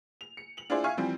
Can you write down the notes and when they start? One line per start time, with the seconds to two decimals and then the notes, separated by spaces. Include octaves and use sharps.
0.21 F7
0.37 C#7
0.57 F7 F#7
0.70 D4 E4 F4 G#4 C5 D5
0.84 E5 F5 G#5 C#6 F6
0.97 E3 F3 G3 C4